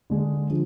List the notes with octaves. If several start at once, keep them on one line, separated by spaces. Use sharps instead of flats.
D3 G#3 D4 G#4
D3 F3